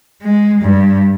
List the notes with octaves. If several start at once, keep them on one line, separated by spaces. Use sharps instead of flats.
G#3
G2